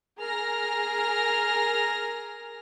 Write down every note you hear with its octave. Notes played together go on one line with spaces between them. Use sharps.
G#4 A#4 F6 A#6